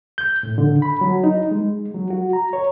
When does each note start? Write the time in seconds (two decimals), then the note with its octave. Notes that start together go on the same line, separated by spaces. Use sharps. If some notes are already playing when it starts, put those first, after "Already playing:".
0.18 G6
0.43 A2
0.58 D3
0.82 B5
1.01 F#3
1.24 D#4
1.51 G#3
1.94 F#3
2.10 F#4
2.33 A#5
2.53 C#5